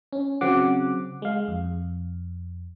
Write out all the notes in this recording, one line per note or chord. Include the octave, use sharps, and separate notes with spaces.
C#4
C#3 F#3 C4 F#5 D6
G#3 F5
F2